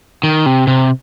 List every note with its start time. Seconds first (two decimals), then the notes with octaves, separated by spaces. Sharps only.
0.23 D#3
0.46 C3
0.67 C3